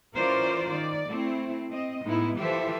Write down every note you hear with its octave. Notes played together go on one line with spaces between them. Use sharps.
E3 C#4 F4 A#4 C5 D5
D#3 D5
A3 C4 E4
C4 D#5
A2 G#3 B3 D#4 E4
E3 F3 G4 A4 C5 E5